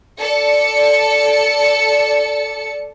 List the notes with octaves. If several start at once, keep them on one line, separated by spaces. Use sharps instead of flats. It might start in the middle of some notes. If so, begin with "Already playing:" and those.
A4 D5 C#7